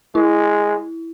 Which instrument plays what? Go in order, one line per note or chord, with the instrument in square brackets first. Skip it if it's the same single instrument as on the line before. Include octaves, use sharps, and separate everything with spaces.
[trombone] G#3 [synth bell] E4